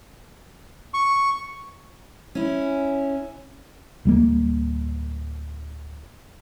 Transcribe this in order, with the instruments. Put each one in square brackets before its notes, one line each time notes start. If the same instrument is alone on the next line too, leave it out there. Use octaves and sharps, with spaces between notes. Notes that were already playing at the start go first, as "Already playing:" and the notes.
[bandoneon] C#6
[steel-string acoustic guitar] C#4 E4
[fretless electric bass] D1 G3 A#3